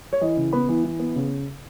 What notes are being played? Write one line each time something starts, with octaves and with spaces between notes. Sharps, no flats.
C#5
E3 D#5
C#3
B3 B5
E3
E3
B3
C#3